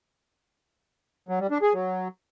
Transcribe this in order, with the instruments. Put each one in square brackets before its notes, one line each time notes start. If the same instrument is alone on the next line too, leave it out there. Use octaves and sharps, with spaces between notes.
[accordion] F#3
G3
D4
G#4
F#3